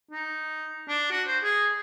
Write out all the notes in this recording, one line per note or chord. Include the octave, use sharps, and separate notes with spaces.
D#4
D4
F#4
C5
G#4